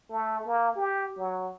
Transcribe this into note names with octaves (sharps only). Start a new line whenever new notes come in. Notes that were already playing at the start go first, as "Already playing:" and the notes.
A3
A#3
G4
F#3